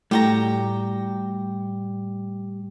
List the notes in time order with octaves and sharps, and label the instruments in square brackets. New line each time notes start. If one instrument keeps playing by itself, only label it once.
[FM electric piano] A2 [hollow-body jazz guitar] G3 F#4 [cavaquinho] G4 G5 A#5